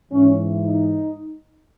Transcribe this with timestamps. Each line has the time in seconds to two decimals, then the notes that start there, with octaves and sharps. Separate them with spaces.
0.12 G#2 E3 C#4
0.65 D#4